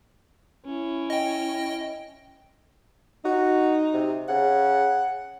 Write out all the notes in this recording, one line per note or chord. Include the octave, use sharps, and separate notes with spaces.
C#4 E4
D#5 G5
D#4 F#4
C3
C#3 F#5